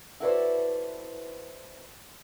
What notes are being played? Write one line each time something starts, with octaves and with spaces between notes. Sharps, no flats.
E4 F#4 A4 B4 C5 D5